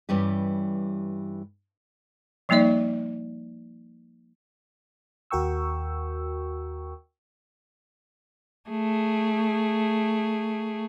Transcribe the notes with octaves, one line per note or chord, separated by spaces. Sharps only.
G2 E3 G3 C#4 G4
F3 G3 A#3 D#4 D5 E5
D#2 F#4 A#4 G5 C#6 E6
A3 G#4